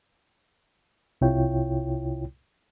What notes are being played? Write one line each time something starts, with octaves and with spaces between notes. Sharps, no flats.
C2 C3 E4 F4 C#5 G5